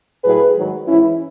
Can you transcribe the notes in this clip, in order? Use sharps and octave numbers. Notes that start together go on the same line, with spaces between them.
A2 F#3 G#4 B4
G#2 D#3 F#3
G#2 E3 C#4 E4